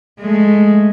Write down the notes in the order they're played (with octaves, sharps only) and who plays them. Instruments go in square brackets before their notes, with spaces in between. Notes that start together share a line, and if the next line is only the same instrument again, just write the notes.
[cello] G#3 A3